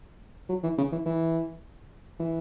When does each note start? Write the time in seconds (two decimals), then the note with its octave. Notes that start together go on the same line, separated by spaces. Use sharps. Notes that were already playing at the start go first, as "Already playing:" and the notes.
0.49 F#3
0.63 E3
0.78 C#3
0.92 E3
1.06 E3
2.20 E3